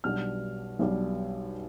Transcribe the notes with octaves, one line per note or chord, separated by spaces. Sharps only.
B1 B2 G3 D4 F6
B1 B2 G3 D4